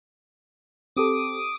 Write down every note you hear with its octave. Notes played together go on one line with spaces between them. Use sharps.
C4 G4 A4 D6 D#6